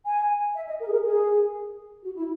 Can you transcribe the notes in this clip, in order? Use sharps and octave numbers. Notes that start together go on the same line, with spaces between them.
G#5
E5
D#5
A#4
G#4
A#4
G#4
F#4
E4